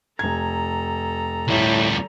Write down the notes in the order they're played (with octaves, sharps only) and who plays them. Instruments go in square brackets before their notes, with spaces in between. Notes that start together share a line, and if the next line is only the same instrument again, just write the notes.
[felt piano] F1 G#6 [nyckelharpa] A4 A#5
[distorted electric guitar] D2 G3 [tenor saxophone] A2